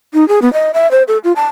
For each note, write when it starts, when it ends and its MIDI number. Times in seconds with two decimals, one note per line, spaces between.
0.14 0.27 63
0.28 0.39 68
0.42 0.51 59
0.53 0.72 75
0.74 0.90 76
0.91 1.03 72
1.08 1.18 69
1.24 1.32 65
1.36 1.46 81